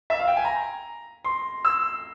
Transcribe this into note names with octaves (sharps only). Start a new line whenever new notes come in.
E5
F5
G5
G#5
A#5
C6
E6